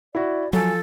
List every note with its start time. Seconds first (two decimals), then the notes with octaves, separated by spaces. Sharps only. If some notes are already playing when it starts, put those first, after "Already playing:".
0.15 E4 F#4 D5
0.53 F3 F#3 A4 G#5